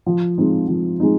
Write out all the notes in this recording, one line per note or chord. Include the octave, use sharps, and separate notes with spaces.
F3
G#3 C4 D#4
F3
G#3 C4 D#4